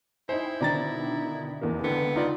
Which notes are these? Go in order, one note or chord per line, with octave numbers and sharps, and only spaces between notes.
D#4 E4 C5 G5 G#5
B2 D3 D#3 D5 A#5 A6
F1 E2 A#3
C#2 D3 B3
D#4 F4 D5